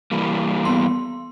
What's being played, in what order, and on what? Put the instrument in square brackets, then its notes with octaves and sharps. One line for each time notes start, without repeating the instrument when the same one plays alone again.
[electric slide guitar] E3 G3 A#3
[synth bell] B3 C6